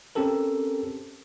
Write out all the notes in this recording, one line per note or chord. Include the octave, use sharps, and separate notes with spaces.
C4 C#4 G4 A4 A#4